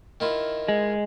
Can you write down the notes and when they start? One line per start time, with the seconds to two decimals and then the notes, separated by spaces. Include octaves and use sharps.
0.20 D#3 E4 F4
0.69 G#3